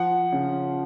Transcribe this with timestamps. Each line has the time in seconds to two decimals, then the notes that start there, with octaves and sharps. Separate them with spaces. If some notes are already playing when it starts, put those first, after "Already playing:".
Already playing: F3 F#5
0.32 C#3